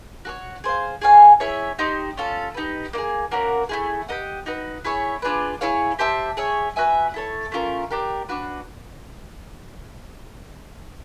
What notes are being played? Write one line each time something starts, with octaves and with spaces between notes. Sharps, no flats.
F#4 A4 C#5
G#4 C5 F5
G#4 C#5 F5 G#5
E4 G#4 C#5 E5
D#4 G4 C5
C#4 F4 A4
D#4 G4 B4
A#3 D#4 G#4
A#3 C#4 F#4 A#4
A3 C#4 E4 G#4
G4 A#4 D#5 F#5
D#4 F#4 B4
E4 G#4 C#5 E5
D4 F4 G#4 B4
E4 G#4 C#5 F5
G4 C5 E5 A5
G#4 C#5 E5
F#4 B4 E5 G#5
E4 A4 C#5
A3 C#4 F4 A#4
D4 G4 A#4
D4 F#4 B4